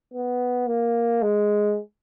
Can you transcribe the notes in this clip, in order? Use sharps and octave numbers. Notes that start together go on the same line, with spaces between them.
B3
A#3
G#3